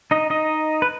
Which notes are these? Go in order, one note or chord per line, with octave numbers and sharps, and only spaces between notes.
D#4 D#5
D#4 D#5
B4